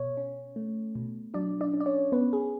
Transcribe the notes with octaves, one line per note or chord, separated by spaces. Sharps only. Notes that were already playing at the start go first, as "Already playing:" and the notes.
Already playing: B2 C#5
C#4
A3
B2
F#3 D4 D5
D4 D5
C#4
D5
C#4 C#5
B3 C#4 B4
G#4